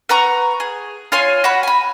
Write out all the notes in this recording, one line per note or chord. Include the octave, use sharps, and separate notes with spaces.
B4 F#5 A#5 C#6
G#4
F4 C#5 G#5 C6
F#4 F#5 B5
G#5 B5